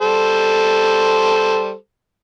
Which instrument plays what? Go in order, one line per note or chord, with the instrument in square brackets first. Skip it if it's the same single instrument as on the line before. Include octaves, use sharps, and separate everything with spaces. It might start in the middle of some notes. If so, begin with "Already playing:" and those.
[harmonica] G3 A4 C5